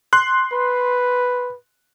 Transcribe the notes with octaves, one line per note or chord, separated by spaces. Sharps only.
C6 F#6
B4